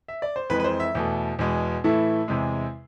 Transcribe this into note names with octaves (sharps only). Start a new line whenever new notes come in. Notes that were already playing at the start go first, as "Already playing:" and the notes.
E5
D5
C5
F2 E3 G#3 B4
B4
C5
E5
E2 B2 A3
E2 B2 G#3
A2 E3 A3 E4
E2 C3 G#3